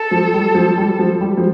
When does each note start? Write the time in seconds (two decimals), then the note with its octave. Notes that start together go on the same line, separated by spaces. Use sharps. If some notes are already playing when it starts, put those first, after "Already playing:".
Already playing: A4
0.11 F3
0.34 G3
0.55 F3
0.78 G3
0.99 F3
1.21 G3
1.37 F3